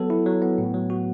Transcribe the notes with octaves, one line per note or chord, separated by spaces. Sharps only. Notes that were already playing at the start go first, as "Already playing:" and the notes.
Already playing: F#3 B3 A4
E4
F#3
B3
A2
F#3
F#4